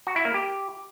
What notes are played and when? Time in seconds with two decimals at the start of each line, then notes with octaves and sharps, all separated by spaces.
0.07 F#4
0.16 E4
0.25 A#3
0.34 G4